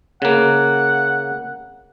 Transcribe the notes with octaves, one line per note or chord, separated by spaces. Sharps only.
C#3 A#3 F#5